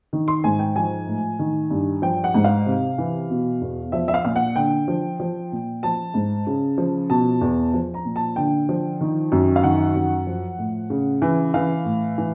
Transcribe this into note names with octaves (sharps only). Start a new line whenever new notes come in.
D#3
C6
G#2 G#5
G5
F3 G#5
A2
D#3
G2
F3 G5
F#5
G#2
F5
C3
E3
B2
E2
F3 E5
E5
F5
A#2 F5
F#5
D3 G5
F3
F3
A#2
F3 A5
G#2
C#3
F3
B2 A5
E2
F3
A#5
A#2
A5
D3 G5
F3
D#3
F#2
F5
D#3 F#5
F#2
F3
A2
C#3
E3
E3 F5
A2
E3